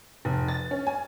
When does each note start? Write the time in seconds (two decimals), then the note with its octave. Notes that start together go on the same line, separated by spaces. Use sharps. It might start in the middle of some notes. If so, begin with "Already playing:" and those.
0.25 F1
0.48 A6
0.71 C#4
0.87 G#5